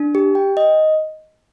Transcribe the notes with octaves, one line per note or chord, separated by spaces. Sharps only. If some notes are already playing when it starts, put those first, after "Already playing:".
Already playing: D4
G4
G5
D#5